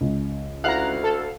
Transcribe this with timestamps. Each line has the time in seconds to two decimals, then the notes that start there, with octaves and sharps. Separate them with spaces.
0.01 C#2
0.64 D2 E4 F5 F#5 A#5 F#6
1.04 A4